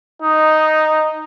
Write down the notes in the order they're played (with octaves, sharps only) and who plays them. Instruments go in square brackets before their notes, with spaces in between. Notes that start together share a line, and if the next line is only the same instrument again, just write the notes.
[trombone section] D#4